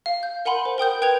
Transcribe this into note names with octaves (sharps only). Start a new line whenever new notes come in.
F5
G6
A#4 F#5 G#5 B5 C6
C5
A#4 G5 D#6 G6
B4 G5 G6 G#6 F7